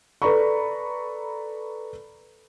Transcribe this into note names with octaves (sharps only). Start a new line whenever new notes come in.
A4 B4 D5 A#5 B5 C#6